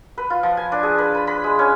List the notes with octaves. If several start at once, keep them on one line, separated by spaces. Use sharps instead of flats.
B4
F4
F3
G#5
D4
G#4
B4
B5
B5
G#3
C#4